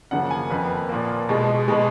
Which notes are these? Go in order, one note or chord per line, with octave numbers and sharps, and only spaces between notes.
F#2 C#3 F3 A#3 F#5
G#5
F2 F3 A#3 B4
A#2 F3 A#3
B2 G#3
B2 G#3